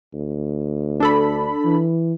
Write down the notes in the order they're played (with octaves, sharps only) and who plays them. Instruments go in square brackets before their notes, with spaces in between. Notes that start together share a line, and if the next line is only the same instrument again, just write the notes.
[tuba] D2
[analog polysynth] D4 A4 B5
[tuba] E3